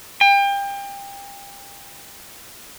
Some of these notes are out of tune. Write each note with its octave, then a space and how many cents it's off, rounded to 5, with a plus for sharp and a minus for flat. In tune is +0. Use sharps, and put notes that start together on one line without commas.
G5 +30